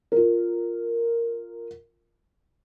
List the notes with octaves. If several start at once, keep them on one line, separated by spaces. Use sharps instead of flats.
F4 A#4